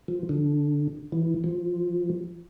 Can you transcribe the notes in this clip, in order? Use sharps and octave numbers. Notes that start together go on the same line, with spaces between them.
F3
D3
E3
F3